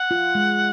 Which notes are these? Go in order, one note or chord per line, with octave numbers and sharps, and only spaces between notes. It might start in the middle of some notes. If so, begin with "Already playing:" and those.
Already playing: F#5
F4
G#3